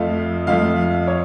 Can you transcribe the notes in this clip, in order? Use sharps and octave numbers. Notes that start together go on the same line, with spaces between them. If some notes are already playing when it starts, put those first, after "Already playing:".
Already playing: F2 F3 A3 F5
F2 F3 A3 F5
C#5